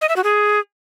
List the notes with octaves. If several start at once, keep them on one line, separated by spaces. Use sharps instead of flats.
D#5
E5
F#4
G#4